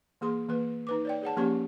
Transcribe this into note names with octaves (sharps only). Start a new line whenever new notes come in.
E3 A#3 G#4 C6
E3 A#3 B4
D#4 B4 D6
C#5 D5 G5
G#4 C#5 F#5 A5
F3 A#3 C#4 G4 C#5 C#6